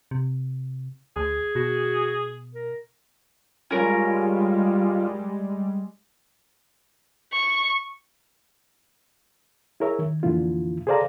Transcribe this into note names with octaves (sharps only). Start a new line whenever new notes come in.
C3
D2 G#4
B2 F#4
A#4
G3 G#3 C#4 F4 A#4 C#5
C#6
E4 G#4 A#4 C#5 E5
D#3
F2 A#2 D3 E3 E4 F4
G#4 A4 C5 D5 F5 A#5